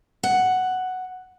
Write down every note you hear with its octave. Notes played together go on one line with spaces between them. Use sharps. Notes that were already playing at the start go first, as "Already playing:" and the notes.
F#5